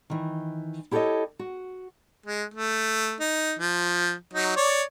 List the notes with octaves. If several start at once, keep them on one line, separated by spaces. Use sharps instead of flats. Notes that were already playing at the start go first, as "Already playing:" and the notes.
D#3 E3
E4 G4 A4 A#4 C#5 D#5
F#4
G#3
A3
D#4
F3
F#3 D#4
C#5 D5